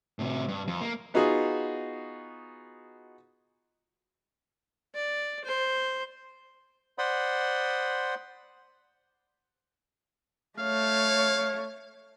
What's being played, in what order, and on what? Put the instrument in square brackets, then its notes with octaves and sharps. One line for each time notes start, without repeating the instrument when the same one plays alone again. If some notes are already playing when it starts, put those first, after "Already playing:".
[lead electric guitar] A2 C3
G2
F2
A#3
[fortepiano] B3 D#4 F4 F#4 G#4
[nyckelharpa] D5
C5
[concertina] C5 D5 F#5 B5 C6 D#6
[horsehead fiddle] A3 C#5 [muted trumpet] F5